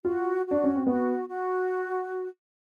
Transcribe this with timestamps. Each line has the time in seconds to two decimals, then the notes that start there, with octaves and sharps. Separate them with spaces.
0.04 F4 F#4
0.46 F#4
0.51 D4
0.64 C#4
0.76 C4
0.86 B3 F#4
1.28 F#4